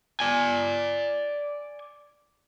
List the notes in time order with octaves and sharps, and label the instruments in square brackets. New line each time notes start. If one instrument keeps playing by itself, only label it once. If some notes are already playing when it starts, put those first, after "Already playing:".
[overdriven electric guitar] D5 G#5